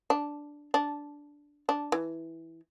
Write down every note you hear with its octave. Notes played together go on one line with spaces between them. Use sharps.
D4
D4
D4
E3